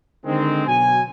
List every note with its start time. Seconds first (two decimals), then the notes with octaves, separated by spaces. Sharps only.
0.25 D3 D#3 G#3 C4
0.67 B2 F#3 G#5